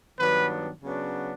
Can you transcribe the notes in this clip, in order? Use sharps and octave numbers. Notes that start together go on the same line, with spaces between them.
G2 D#3 F#3 B3 D4 B4
C#3 F#3 B3 D4